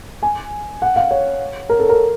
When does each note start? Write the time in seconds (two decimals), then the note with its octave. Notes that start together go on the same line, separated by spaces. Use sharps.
0.23 G#5
0.82 F#5
0.96 F5
1.11 C#5
1.69 A#4
1.80 A4
1.89 A#4